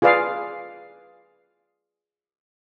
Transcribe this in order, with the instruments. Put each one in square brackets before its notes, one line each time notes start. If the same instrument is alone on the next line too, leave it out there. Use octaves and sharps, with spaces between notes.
[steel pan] F4 G#4 B4 D5 F5